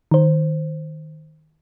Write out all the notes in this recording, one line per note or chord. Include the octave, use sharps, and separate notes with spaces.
D#3 C5